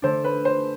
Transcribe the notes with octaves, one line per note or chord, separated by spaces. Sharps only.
D3 A3 D4 A4 C5 D5
B4
C5